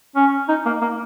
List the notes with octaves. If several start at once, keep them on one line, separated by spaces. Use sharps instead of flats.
C#4
D#4
A#3
A#3